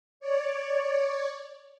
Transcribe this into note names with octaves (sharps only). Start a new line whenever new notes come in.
C#5 D5